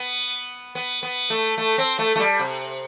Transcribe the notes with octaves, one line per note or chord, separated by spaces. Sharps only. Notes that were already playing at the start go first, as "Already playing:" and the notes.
Already playing: B3
B3
B3
A3
A3
C4
A3
A3
G3
C3